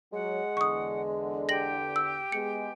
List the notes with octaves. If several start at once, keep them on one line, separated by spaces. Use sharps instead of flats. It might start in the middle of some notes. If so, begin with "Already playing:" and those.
F#3 G#3 F#5
E2 D3 C#6 D#6
G4 G5 A#6 F#7
E6
G#3 B3 G#4 C#7